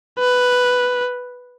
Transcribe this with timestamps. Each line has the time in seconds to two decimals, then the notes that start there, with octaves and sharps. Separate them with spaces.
0.19 B4